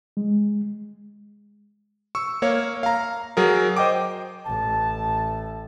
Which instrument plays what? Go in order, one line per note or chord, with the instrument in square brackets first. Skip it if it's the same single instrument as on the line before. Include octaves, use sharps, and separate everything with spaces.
[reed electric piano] G#3
[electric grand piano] C#6 E6
A#3 C#5 F5
F5 A#5
F#3 G#4 A#4
C5 D#5 G5 D6
[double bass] A1 [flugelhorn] A5